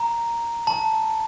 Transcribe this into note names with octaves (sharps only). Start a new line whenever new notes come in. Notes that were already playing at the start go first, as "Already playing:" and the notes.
Already playing: A#5
A5